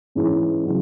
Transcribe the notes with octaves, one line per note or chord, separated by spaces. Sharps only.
G#2 E3 G#3 C#4
C#3 F#3 F#4